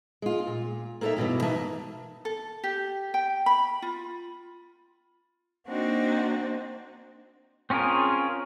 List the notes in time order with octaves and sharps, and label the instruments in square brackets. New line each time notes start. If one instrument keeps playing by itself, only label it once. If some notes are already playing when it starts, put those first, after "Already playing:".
[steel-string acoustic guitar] G#3 F4
A#2
A#3 D#4 A4 B4 C#5 E5
G2 B2 D3 E3
E3 A#3 D#4 E5 A5
[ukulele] A4
G4
G5
B5
F4
[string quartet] A#3 C4 D4 D#4 F#4
[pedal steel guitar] C4 C#4 F4 G#4 A#4